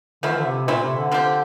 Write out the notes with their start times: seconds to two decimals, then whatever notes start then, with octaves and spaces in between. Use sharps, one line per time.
0.23 D3 F3 A3 E4
0.31 E3
0.38 D3
0.45 C3
0.68 A#2 A3 C4 E4
0.82 C3
0.97 D3
1.12 F3 C4 G4